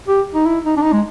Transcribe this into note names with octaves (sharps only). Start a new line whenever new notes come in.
G4
D#4
E4
D#4
D4
D#4
G#3